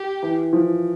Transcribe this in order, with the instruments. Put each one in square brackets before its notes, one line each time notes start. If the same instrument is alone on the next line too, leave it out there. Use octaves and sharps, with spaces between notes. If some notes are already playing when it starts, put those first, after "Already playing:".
Already playing: [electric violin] G4
[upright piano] E3
F3